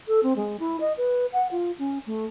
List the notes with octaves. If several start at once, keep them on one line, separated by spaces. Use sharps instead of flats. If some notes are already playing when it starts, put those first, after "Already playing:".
A4
C4
G#3
E4
D#5
B4
F#5
F4
C#4
A3